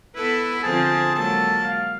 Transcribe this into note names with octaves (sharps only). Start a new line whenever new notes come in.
B3 E4 A4 B4
D3 F3 C4 G#4 A5
F#3 G#3 A#3 A4 A5
F5